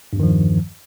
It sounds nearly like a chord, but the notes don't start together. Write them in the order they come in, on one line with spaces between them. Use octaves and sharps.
G2 E2 D#3 F3